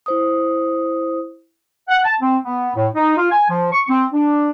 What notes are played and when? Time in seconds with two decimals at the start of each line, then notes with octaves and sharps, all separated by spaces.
0.06 E4 C5 D#6
1.89 F#5
2.04 A5
2.21 C4
2.44 B3
2.76 A2
2.95 D#4
3.17 F4
3.31 G#5
3.49 F3
3.72 C#6
3.89 C4
4.13 D4